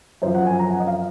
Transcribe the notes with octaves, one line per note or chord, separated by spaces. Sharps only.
F#2 F3 C5
F#5
G#5
A#5
F#5
D#5
F5